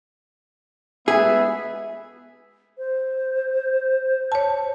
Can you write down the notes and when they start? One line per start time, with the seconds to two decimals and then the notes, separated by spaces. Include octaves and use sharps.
1.08 G#3 B3 G#4 E5
2.78 C5
4.32 C#5 A5